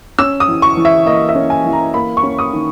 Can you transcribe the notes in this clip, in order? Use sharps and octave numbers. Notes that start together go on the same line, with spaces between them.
C#4 E6
D#6
E3
C#6
E3
E5
A#3 D#5
E5
C#4
G#5
E3
A#5
A#3 B5
C#6
C#4
D#6
D#3